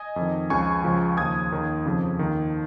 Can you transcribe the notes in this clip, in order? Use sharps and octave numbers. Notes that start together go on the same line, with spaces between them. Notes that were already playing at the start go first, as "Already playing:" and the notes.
Already playing: D#5 G#5
F2
D#3
C#2 C#3 F3 G#5 C#6
C#2 C#3 F3
D#2 C#3 F3 D#6 G#6
D#2 D#3
F2 C#3 F3
D#2 D#3